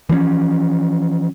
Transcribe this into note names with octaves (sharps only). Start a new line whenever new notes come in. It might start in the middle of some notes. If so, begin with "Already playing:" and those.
E3 F3 B3 C#4